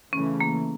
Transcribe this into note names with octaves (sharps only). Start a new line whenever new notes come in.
C#3 E3 A3 C#4
A#3